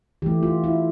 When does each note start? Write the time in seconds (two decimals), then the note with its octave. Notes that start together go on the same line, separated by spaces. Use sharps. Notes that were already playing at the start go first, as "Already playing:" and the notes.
0.22 E3 A3 G4
0.43 F4
0.64 E4